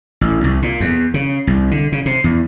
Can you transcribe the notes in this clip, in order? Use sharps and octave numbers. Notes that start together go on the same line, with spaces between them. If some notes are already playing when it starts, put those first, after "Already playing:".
A1
C2
A#2
E2
C#3
C2
D3
C#3
C3
E2